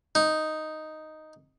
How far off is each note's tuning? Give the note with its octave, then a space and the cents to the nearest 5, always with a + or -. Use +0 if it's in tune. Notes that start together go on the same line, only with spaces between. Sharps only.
D#4 +0